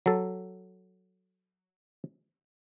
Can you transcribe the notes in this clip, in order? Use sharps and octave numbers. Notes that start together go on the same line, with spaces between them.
F#3 A4